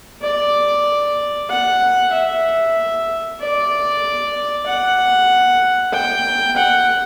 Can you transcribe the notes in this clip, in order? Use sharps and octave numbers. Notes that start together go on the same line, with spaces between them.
D5
F#5
E5
D5
F#5
G5
F#5